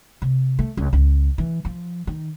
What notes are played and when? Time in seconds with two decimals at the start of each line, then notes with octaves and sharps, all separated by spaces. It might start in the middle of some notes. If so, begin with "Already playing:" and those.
0.22 C3
0.59 A3
0.77 C#2
0.93 C#2
1.38 E3
1.65 F3
2.07 D#3